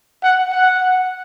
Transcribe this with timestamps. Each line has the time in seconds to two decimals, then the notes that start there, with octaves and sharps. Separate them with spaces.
0.23 F#5
0.53 F#5